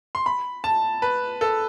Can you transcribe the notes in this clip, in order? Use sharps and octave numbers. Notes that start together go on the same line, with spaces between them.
C6
B5
A5
B4
A4